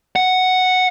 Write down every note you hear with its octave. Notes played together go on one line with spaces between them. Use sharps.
F#5